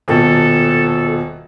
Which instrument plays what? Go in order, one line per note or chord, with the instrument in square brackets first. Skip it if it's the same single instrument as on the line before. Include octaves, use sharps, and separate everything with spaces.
[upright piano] D#1 B2 [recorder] A4